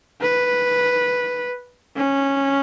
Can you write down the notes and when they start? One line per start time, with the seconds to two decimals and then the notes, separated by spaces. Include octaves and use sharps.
0.21 B4
1.96 C#4